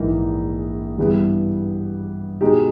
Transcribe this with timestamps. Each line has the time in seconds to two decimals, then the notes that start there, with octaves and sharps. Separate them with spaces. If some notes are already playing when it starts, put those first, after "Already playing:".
Already playing: A#1 G#2 E3 A#3 D#4
0.98 G2 E3 G3 B3 G4
2.41 B2 G#3 D#4 G4